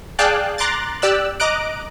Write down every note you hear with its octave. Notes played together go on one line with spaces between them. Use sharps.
G#4 D5 F5 G5 A5 F#6
A#5 C6 D6 F#6 A6
G4 D5 E6 F#6
D#5 A#5 D6 F#6 D7